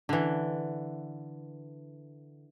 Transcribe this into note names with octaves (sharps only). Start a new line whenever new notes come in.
D3 E3